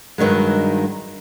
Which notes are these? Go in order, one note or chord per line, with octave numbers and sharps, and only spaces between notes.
G2 D#3 F#3 G#3